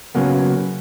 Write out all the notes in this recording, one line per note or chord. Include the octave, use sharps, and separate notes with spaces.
C#3 F#3 A#3 B3